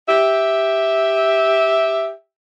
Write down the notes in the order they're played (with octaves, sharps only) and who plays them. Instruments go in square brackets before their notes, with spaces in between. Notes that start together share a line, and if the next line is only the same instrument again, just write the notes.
[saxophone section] G4 E5